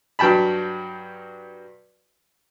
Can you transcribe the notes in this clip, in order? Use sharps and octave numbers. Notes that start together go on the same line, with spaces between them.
G2 F#3 G5 A5 B5